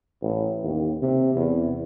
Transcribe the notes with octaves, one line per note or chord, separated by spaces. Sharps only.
A1
D#2
C3
E2